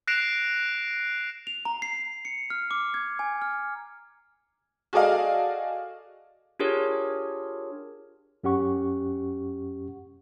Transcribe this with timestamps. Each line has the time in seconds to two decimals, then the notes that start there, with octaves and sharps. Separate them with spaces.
0.07 F#6 A#6 C7 D7 E7 F7
1.47 F7
1.65 A#5
1.82 C7
2.25 C#7
2.50 F6
2.71 D6
2.94 G#6
3.19 G#5
3.42 F6
4.93 F#4 G#4 A4 D5 D#5 F5
6.59 D4 F4 G4 G#4 A#4 C#5
8.43 F#2 C#4 G4 F#5 C#6